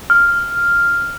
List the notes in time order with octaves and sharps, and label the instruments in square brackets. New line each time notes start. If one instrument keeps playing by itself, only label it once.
[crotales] F6